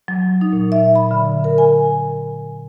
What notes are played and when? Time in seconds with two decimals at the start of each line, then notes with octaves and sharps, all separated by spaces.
0.08 F#3
0.41 D#4
0.53 A#2
0.72 E5
0.95 B5
1.11 D3
1.44 A#4
1.58 G#5